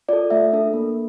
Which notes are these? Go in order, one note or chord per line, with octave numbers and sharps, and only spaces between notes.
F4 A4 D5
A3 E5
D4 A4
A#3